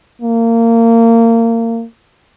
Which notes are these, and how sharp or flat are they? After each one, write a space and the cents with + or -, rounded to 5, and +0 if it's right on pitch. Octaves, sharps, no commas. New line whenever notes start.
A#3 -25